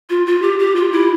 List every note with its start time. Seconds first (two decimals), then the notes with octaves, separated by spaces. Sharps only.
0.10 F4
0.26 F4
0.42 G4
0.59 G4
0.76 F4
0.92 E4